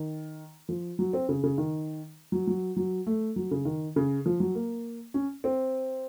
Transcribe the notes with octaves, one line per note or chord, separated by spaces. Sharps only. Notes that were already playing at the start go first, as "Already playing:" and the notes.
Already playing: D#3
F3
F#3
C4
C#3
C#3
D#3
F#3
F#3
F#3
A3
F#3
C#3
D#3
C#3
F3
F#3
A#3
C#4
C4